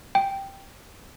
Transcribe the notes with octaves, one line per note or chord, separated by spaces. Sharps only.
G5